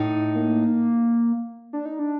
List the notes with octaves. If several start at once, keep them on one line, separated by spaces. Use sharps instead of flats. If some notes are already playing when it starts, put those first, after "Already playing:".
Already playing: A2 D#4
A#3
D4
D#4
D4